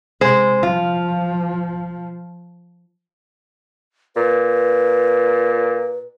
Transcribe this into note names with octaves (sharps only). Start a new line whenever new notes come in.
C3 G#3 C5
F3 F4
A#2 B4